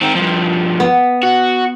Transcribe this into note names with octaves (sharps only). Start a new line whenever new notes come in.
D#3 C4
G2 F3
B3
F#4